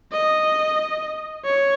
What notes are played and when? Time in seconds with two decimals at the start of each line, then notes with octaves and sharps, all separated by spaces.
0.12 D#5
1.45 C#5